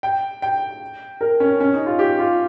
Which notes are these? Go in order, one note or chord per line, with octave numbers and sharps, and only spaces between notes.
G5
G5
A#4
C#4
C#4
D#4
F4
G4
F4